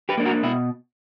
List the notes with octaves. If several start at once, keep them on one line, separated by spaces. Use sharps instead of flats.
G4 B4
A#3 D4
F#4 A#4
B2 E4